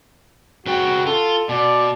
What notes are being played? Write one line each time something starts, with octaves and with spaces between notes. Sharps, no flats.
C#3 F#4 B4 G5
F4 A4
B2 D5